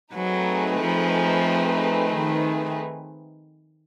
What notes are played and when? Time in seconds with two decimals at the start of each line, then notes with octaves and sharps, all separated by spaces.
0.14 F#3 A3 C4 D#4 G#4 B4
0.79 F3
2.11 D#3